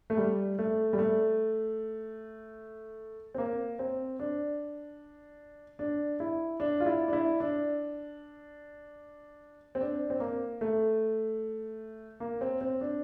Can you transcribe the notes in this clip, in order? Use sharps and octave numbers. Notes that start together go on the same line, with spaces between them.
A3
G3
A3
G3
A3
C4
A#3
C4
D4
D4
E4
D4
F4
E4
D4
E4
D4
C4
D4
C4
A#3
A3
A#3
C4
C4
D4